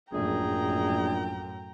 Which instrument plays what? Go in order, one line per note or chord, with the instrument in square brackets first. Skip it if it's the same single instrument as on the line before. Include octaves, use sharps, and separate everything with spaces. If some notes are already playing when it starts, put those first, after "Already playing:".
[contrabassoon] A#1 [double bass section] F#2 A2 [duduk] G#4 [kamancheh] G5 A#5